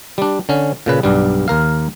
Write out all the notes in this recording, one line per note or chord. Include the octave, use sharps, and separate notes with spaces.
G3 D4
D3 C#4
A#2 C#3 B4
B1 G2 G3
D#2 A#4 F5